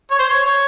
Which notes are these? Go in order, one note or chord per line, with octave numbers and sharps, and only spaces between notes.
C#5
C5
C#5
C#5